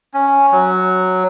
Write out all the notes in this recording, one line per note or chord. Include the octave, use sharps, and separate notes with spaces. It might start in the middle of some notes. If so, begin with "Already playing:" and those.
C#4
F#3